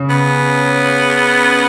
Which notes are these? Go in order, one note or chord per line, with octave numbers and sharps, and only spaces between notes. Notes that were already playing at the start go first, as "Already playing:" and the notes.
Already playing: C#3
B3